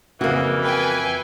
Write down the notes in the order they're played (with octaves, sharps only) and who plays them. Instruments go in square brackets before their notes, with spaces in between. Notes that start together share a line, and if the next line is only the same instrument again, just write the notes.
[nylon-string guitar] F2 F#4 [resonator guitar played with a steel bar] C#3 A#3 [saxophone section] E3
[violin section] B4 G5 G#5